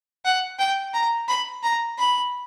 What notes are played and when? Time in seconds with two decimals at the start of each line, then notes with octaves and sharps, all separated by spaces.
0.25 F#5
0.59 G5
0.94 A#5
1.28 B5
1.63 A#5
1.98 B5